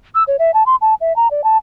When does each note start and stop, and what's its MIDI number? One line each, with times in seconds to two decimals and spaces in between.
0.15 0.23 88
0.28 0.37 73
0.39 0.51 76
0.54 0.63 81
0.66 0.76 84
0.81 0.94 81
1.01 1.15 76
1.16 1.30 82
1.31 1.44 74
1.44 1.57 81